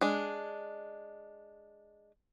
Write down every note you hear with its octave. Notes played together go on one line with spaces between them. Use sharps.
G#3 D4